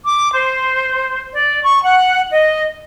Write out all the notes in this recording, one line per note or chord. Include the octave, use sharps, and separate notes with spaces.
D6
C5
D5
C#6
F#5
D#5